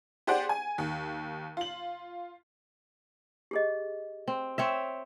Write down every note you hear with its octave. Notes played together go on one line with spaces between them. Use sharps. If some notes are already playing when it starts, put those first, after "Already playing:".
G4 G#4 C5 D5 F#5 G5
G#5
D#2
F4 F#7
G4 G#4 D#5
C4
C4 C#5 E5